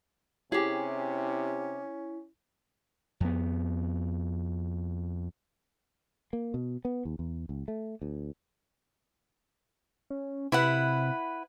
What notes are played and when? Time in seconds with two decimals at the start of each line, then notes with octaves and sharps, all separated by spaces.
0.52 C3 C#4 E4 G4 G#4
3.20 F2 B3
6.33 A#3
6.54 B2
6.85 B3
7.05 D#2
7.19 E2
7.49 C#2
7.68 A3
8.02 D2
10.10 C#4
10.52 C3 E4 B4 F#5